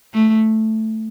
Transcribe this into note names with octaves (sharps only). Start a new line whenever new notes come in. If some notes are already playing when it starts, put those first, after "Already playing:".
A3